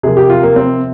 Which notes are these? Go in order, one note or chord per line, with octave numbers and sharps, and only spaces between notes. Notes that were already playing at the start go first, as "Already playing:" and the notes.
C3 F3 A#3 G#4
G4
F4
A#3
C4